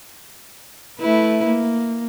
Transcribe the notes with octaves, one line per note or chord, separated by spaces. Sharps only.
A3 E4 B4
A#3